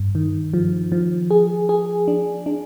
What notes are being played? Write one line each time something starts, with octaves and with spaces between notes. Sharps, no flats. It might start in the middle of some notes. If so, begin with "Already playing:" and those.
Already playing: G2
D#3
F3
F3
G#4
G#4
D4
D4